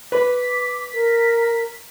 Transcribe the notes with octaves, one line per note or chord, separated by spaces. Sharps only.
B4 B5 D6 B6
A#4